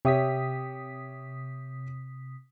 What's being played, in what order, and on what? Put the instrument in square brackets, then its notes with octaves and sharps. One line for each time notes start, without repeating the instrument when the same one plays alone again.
[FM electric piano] C3 D#6 B6 [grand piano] G4 C#5 E5